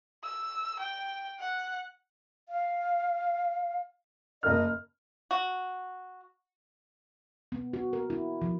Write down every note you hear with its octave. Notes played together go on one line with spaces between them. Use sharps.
E6
G5
F#5
F5
F#1 A#4 D#5 F6
F#4
B3
F#4
A#4
E4
F3